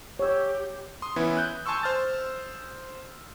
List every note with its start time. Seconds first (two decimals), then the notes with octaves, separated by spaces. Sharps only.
0.19 G4 C#5 E6
1.02 C6 D#6
1.16 E3 B3 C#4 E4
1.37 F#6 G6
1.66 G#5 A5 C6 C#6 E6
1.83 C5 F6 A6